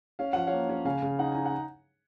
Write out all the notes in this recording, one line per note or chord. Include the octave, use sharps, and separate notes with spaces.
C#4 F5
F3 F#5
C#5 F5
A#3
C#4
C#3 F5 G#5
C#3
D#4 F#5
D#4 G#5
F#5